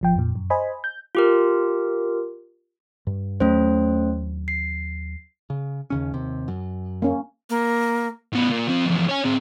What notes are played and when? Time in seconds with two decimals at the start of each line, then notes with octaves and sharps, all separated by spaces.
0.01 G#1 F3 G5
0.15 F2 A#2
0.35 F#2
0.50 C5 D#5 G#5 B5
0.84 G6
1.15 F4 G4 A#4
3.07 G2
3.40 D#2 F#3 A3 C#4 C5
4.48 C7
5.50 C#3
5.90 D#2 C#3 C#4
6.14 D#2 C3
6.48 F#2
7.02 A#3 C#4
7.50 A#3
8.33 A2 B3
8.49 A#2
8.67 F3 C4
8.85 E2 F3
9.09 C#5 G#5
9.26 C4 G#4